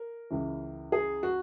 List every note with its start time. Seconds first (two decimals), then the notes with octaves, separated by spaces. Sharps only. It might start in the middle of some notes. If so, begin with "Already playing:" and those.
Already playing: A#4
0.30 C#2 C#3 E3
0.92 G#4
1.23 F#4